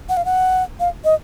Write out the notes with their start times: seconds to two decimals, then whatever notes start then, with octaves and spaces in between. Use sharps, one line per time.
0.09 F#5
0.17 F5
0.25 F#5
0.80 F5
1.05 D#5